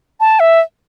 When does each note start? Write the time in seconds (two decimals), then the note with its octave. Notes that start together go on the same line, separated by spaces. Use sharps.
0.20 A5
0.40 E5